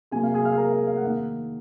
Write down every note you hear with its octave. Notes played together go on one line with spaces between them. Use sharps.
C3 F#3 A#3 G#4 G#5
F5
G#4 G#5
F5 F6
A#4 A#5
F5
F5
F#5
D#3 A#3 F5